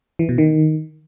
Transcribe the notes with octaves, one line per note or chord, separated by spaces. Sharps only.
E3
B2
D#3